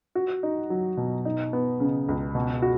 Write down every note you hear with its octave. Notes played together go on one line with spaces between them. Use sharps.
F#4
D#4
F#3
B2
D#4
B3
C#3
C#2
B2
F#4